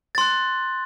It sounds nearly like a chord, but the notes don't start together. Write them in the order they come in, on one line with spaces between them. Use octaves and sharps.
A6 C6 F#6